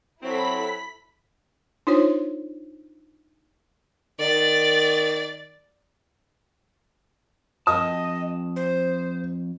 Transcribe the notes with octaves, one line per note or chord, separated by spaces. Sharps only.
F#3 C4 E4 A4 B5 B6
D4 D#4 F4 C5 C#5
D#3 D5 A6
F2 D#5 A5 D#6
C5